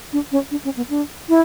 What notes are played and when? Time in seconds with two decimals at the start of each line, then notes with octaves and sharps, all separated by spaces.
0.13 D4
0.32 C#4
0.51 D4
0.65 C#4
0.77 B3
0.90 D4
1.29 E4